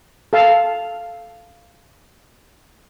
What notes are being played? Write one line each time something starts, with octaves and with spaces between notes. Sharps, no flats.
A4 F5 A5